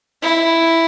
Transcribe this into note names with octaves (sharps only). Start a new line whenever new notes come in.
E4